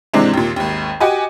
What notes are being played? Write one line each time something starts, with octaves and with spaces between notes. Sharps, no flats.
G#2 C3 E3 G#3 C4 D4
D#2 A#2
G#1 D#2
F#4 G4 D#5 G#5